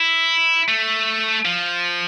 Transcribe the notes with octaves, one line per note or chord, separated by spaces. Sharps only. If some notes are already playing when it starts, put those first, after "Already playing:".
Already playing: E4
A3
F3